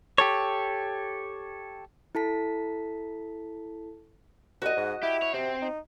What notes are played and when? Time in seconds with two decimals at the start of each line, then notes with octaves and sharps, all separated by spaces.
0.18 G4 A4 C#5
2.15 E4 A4 A5 B6
4.62 C2 F#4 D#5
4.77 G#2
5.03 E4 G4
5.22 C#5
5.34 C3 C4
5.62 D#4